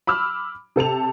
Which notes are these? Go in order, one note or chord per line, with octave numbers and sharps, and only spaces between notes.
B5 D6 E6 F6
C3 A4 A5 F7